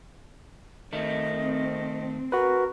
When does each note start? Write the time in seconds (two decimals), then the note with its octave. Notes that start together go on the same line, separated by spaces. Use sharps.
0.93 D#3 A3 C4 D#5
2.32 F#4 A#4 B4